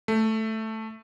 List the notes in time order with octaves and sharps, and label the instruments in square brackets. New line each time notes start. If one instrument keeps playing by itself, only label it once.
[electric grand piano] A3